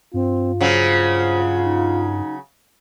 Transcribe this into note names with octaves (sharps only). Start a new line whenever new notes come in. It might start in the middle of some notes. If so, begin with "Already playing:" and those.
G2 C4 F4
C#3 F#3 C5
D#4